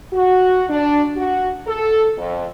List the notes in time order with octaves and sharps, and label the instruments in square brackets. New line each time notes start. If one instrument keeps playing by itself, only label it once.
[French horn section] F#4
D4
F#4
A4
F2